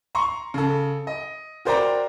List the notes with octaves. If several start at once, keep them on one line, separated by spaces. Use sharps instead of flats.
A#5 C6 C#6
C#3 A4
D#5
F#4 A#4 C5 D5 G5 A#5